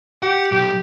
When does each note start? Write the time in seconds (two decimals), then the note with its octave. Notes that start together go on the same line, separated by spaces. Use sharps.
0.23 G4 F#5
0.52 B1 G4